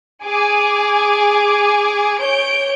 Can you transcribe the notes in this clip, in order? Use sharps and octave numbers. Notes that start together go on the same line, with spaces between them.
G#4 G#5 D6
C#5 G6 D7